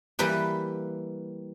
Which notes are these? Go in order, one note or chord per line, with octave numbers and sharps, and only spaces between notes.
E3 G3 A#3 B4 G5